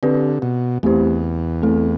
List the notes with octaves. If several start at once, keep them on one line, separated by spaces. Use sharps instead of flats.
D3 C4 G4 B4 D5
B2
E2 A3 C4 E4 G4 C5
A3 C4 E4 A4